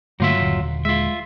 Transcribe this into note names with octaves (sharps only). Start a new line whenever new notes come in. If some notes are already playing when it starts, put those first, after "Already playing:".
G2 D3 F#3 A3 A#3 F4 E5
D#1 D3
G#3 F4 E5